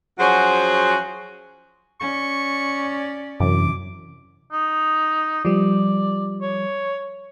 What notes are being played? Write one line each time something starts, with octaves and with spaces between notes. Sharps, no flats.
F3 F#3 C#4 F#4 G#4 C5
C#4 D5 C#6
F#2 C3 E3 D6
D#4
F3 G3 D5
C#5